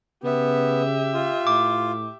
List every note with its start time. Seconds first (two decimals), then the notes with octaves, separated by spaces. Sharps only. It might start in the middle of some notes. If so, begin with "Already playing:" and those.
0.24 C#3 B3 G4 E5
1.14 F4
1.47 A2 D6